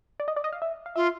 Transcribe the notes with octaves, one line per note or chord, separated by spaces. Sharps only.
D5
D#5
D5
D#5
F5
E5
F5
F4 E5